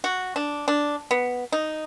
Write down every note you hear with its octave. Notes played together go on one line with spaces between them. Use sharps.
F#4
D4
D4
B3
D#4